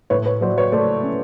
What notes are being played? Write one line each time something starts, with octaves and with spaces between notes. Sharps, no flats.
A2 B4 C#5
B4 C#5
F#3 C5 D5
B4 C#5
A3 C5 D5
C#4